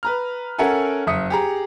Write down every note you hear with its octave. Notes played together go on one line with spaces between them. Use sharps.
B4 A#5 F6
C#4 A4 A#4 E5 F#5 G#5
F#1 E5 D#6 C#7
G4 G#4 A#5